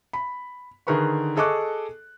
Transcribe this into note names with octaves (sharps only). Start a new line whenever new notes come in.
B5
D3 D#3 G#4 A#4 B4 C#6
G#4 A4 D#5 C#6 D6 F#6